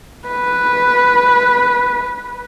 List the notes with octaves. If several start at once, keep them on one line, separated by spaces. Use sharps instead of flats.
B4